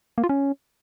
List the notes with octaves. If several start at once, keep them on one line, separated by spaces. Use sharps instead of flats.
A#3
F4
C#4